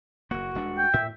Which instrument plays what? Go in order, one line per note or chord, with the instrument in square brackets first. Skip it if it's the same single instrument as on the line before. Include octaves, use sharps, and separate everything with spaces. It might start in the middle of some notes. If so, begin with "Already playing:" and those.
[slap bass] F#1 A#3 [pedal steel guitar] F#4
[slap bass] D#1 G#3 D4
[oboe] G5
[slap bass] A2 [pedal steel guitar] E5